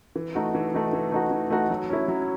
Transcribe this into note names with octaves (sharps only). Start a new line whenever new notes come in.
E3
A3 D#4 F#4
E3
A3 D#4 F#4
E3
A3 D#4 F#4
E3
A3 D#4 F#4
F#3
C#4 E4
F#3